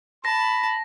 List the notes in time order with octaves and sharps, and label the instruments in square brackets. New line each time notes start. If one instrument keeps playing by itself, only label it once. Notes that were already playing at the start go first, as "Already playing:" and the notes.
[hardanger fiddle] A5 [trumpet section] B5 [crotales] A#6